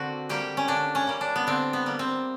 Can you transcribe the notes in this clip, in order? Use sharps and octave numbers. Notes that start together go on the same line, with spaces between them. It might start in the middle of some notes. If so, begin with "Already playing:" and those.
Already playing: D3 A#3 C4 F#4
G3 A#3 G4
C#4
D3 D4
C#4
G3 A#3
D4
B3
D3 C4
B3
G3 A#3
C4